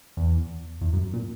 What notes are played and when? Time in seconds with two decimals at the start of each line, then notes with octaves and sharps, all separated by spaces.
0.17 E2
0.81 E2
0.93 F#2
1.13 A#2